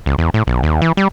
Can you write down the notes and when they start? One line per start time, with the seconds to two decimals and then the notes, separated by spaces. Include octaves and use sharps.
0.06 C#2
0.18 E2
0.34 A2
0.47 B1
0.63 D#2
0.82 E3
0.97 G3